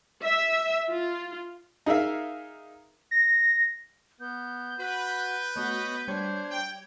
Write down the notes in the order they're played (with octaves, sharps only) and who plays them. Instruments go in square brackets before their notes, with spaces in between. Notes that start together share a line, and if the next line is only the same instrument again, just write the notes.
[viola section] E5
F4
[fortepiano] D#4 G#4 A#4 E5 F5
[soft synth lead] A#6
[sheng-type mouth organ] B3 [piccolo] G6
[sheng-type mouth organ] F#4 B5 [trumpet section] B4
[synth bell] A3 B3 F#4 [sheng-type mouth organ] C#5 D#5
[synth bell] G3 C#5 G#6 [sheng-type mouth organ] D4 C5
[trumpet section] G5